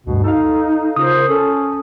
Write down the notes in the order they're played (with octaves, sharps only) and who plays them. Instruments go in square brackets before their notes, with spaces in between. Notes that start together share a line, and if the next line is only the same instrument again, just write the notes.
[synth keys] D2 G2 [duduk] B2
[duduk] D#4 [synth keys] A4 F5
[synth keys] C#3 F4 A#4 [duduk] C5 [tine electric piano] D#6
[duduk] C#4 [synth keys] A4